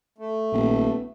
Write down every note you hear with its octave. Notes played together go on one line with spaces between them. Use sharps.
A3
D#1 A#1 B3